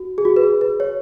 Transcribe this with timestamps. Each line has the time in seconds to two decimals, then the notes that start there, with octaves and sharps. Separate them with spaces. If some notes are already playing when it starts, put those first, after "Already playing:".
Already playing: F#4
0.18 G#4
0.25 F#4
0.36 B4
0.43 G#4
0.61 B4
0.80 C#5